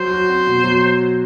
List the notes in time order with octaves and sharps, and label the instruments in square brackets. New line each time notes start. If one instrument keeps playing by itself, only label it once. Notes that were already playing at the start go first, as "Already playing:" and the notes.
Already playing: [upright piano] F#3 [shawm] C5
[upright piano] F#4
C4
B2
F#3